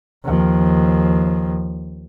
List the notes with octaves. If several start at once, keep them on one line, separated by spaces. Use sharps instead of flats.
D#2 F3